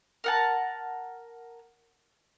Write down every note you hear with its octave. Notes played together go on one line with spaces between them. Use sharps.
A#4 F#5 A5